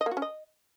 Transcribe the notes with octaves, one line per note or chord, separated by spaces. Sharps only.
D#5
A#3
F#4
C#4
D#5